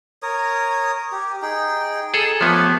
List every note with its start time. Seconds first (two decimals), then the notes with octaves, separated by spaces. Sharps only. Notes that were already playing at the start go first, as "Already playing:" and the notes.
0.23 A#4 C#5 D#6
1.12 G4
1.42 D#4 G#4 G5
2.14 G#4 A4 A5
2.41 F3 A3 B3 G4 C#5